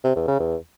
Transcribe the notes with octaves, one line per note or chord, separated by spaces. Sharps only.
C3
E2
C#3
E2